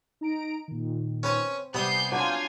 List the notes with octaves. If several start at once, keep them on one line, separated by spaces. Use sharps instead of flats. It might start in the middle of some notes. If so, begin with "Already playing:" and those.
D#4 A#5 D7
A#2 D#3
C4 C#4 B4 C#5
C3 G3 B3 G#5 D#6 G6 C7
F#3 D4 F4 F#4 F5 G#5 G6 G#6